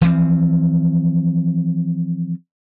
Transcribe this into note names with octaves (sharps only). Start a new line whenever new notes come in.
E3 F3 A3 C4